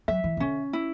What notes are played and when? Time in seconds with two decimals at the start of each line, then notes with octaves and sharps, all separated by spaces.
0.08 F#3 E5
0.24 E3
0.37 C#3
0.40 D3 C#4
0.73 E4